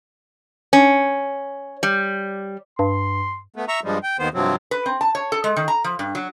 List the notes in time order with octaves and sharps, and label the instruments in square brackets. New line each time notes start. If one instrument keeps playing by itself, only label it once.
[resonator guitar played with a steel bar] C#4
G3
[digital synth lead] G2 [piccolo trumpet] C6
[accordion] A3 B3
E5 A#5 C#6
G2 F3 G3 G#3
G5
D#2 D#3 B3 C5
G2 C3 F3 F#3 C4
[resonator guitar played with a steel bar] B4
C4
A5
C#5
A4
G#3
D#3
A#5
F3
G2
F#3